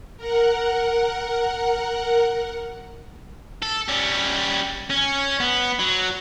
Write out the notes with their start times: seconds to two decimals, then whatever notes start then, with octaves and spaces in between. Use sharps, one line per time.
0.17 A#4 F#5
3.62 A4
3.88 G3 C#4
4.90 C#4
5.40 B3
5.79 F#3